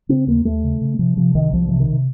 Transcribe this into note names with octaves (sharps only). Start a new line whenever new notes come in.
C#3 C4
D#2 A#3
D#2 A3
C#3
C#3
C3 F3
C3 F3
C2 D#3
C2 F3
C3 F3
D#3
C3